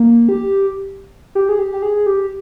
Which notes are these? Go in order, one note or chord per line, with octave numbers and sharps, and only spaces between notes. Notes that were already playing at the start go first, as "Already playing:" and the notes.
Already playing: A#3
G4
G4
G#4
G4
G4
G#4
G4